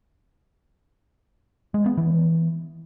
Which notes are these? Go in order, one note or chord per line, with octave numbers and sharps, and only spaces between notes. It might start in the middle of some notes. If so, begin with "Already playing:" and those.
G#3
B3
E3